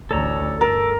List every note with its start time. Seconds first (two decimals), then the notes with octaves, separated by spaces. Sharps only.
0.11 A1 D2 A4 C#5 A#5
0.61 G2 A4 A#4